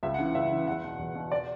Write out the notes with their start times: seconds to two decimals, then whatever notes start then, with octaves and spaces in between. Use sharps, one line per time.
0.03 C#2 E5
0.14 F#5
0.19 C#3 E3
0.35 C#2 E5
0.52 C#3 E3
0.67 E2 F#5
0.84 B2
0.99 E2
1.15 B2
1.32 D5